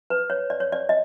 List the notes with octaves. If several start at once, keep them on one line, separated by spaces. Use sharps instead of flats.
B4
C#5
D5
C#5
D5
D#5